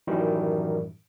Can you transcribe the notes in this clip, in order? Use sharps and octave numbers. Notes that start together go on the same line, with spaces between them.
F#2 A2 D#3 E3 G3